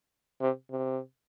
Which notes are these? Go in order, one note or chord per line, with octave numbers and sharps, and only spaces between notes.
C3
C3